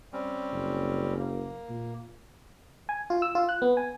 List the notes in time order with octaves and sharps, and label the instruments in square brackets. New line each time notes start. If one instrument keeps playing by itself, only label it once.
[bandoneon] G3 C4 C#4
[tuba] F#1
[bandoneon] A#3
[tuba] A#2
[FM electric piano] G#5
F4
E6
F4
F#6
B3
G#5